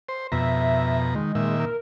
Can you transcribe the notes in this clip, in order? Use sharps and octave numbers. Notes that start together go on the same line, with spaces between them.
C5
F2 B2 E5 A#5
D#3 G#3
A#2 D#3 E5
A#4